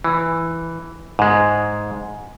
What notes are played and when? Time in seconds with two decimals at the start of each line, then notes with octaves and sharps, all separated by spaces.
0.04 E3
1.19 G#2 G#3